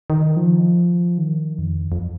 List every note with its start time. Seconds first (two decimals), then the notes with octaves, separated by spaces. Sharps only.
0.10 D#3
0.36 F3
1.18 D#3
1.59 F2
1.92 F2